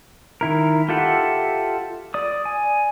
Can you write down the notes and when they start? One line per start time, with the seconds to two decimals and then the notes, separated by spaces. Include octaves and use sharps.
0.41 D#3 E4 A#4
0.89 F4 G4 A4 E5 F#5
2.14 D5 D#6
2.45 G#5